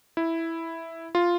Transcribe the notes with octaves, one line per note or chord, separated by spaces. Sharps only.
E4
F4